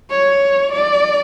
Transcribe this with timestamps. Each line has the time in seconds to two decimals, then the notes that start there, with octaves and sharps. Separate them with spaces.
0.10 C#5
0.72 D5